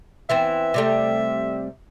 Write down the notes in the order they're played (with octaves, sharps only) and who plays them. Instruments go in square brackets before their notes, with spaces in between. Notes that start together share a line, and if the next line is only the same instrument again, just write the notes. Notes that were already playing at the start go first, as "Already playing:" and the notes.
[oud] E3 B3 C4 [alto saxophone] E5
[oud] C3 G3 A3